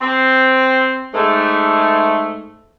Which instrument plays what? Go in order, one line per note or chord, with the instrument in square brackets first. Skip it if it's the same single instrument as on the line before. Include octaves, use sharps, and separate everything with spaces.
[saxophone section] C4
G#2 A3